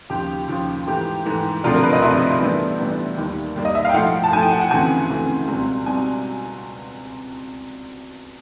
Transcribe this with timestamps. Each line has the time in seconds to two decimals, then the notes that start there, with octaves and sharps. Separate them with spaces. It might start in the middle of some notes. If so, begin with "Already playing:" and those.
0.10 D#2 C#3 F3 G4
0.48 D#2 C#3 F3
0.87 G#2 E3 A3 G4
1.25 G#2 E3 A3
1.64 D2 C3 F3 A3 D4 F4
1.73 A#4
1.83 B4
1.93 D#5
2.02 D2 C3 F3 A3 D4 E5
2.41 A2 E3 G3 B3 D4
2.79 A2 E3 G3 B3 D4
3.17 D#2 D#3 G3 A#3
3.56 D#2 D#3 G3 A#3
3.65 D#5
3.75 E5
3.85 F5
3.89 G5
3.94 A2 F3 A3 F#5
4.24 A5
4.32 A2 F3 A3 G#5
4.42 G5
4.51 F#5
4.61 F#5
4.71 D2 C#3 E3 A3 C4 G#5
5.10 D2 C#3 E3 A3 C4
5.48 C#2 B2 G3 C4
5.86 B2 G3 C4 G#5